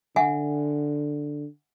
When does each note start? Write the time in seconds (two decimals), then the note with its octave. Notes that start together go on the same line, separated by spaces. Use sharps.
0.16 D3 E5 F#5 G#5